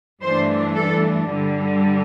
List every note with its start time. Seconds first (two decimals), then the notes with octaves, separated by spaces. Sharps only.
0.23 G2 E3 A3 D4 C5
0.76 A4
1.29 G2 D3 G3